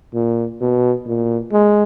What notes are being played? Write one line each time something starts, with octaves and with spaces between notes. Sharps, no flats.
A#2
B2
A#2
G#3